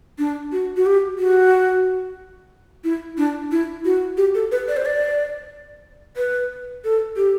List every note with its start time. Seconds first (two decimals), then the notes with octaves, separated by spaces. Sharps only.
0.19 D4
0.52 F#4
0.77 F#4
0.86 G4
1.19 F#4
2.84 E4
3.18 D4
3.52 E4
3.85 F#4
4.17 G4
4.35 A4
4.52 B4
4.68 D5
4.77 C5
4.85 D5
6.17 B4
6.84 A4
7.16 G4